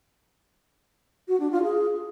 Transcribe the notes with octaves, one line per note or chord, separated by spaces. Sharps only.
F#4
D4
F4
G#4